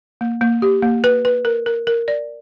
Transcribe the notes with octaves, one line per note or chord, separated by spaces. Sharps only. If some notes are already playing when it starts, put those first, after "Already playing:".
A#3
A#3
G4
A#3
B4
B4
A#4
A#4
A#4
D5